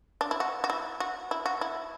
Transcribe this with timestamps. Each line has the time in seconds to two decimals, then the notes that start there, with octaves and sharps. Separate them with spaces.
0.21 D4
0.31 E4
0.40 F#4
0.64 F#4
0.70 E4
1.00 F#4
1.31 E4
1.46 F#4
1.61 E4